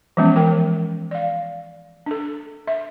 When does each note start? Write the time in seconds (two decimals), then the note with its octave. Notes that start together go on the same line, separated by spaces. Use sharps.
0.17 E3 F3 G#3 B3 C#4
0.36 E3 A#4 G5
1.11 D5 F5
2.06 D4 A4
2.67 E5